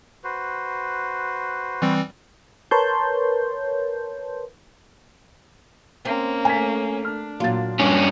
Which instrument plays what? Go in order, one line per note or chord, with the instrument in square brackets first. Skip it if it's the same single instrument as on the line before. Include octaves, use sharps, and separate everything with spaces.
[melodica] F#4 B4 C5
[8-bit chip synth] E3 G3 C4
[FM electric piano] A#4 B4 C#5 A5 C6 G6
[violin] A#3 C#4 [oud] C4
[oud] A3 [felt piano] G#5 B6
[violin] D4 [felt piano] F6
[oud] A#2 F4 [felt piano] F#3 A#3 A6
[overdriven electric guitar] G2 C#4